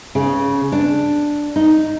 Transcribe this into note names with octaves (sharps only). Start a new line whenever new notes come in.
C#3
D4
D#4